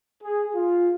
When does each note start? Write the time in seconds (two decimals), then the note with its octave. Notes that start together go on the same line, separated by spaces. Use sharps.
0.22 G#4
0.55 F4